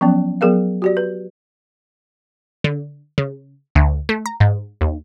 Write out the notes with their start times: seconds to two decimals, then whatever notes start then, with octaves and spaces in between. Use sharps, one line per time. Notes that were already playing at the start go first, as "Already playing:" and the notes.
0.01 F3 F#3 B3 C#4
0.41 F#3 B3 G#4 A#4 F5
0.82 F#4 G4 D5
0.97 B4
2.64 D3
3.18 C#3
3.75 D2
4.09 A3
4.26 A#5
4.40 G#2
4.81 D#2